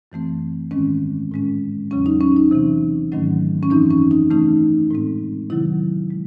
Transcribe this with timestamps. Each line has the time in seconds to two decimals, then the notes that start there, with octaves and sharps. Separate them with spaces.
0.12 F#2 E3 A3 C4
0.71 G#2 D#3 G#3 C4 C#4
1.31 A2 G#3 C#4
1.91 E2 C#3 F#3 C#4
2.06 D#4
2.21 C#4
2.36 D#4
2.51 C3 E3 C4
3.12 G#2 D#3 F#3 A3 C#4
3.63 C#4
3.70 F#2 E3 C4 D#4
3.91 C#4
4.11 D#4
4.30 C#3 E3 A3 C#4 D#4
4.91 A2 G#3 C4
5.50 C3 D#3 F#3 E4
6.10 G#3